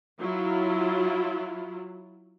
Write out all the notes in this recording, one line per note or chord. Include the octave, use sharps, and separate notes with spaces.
F#3 E4 F4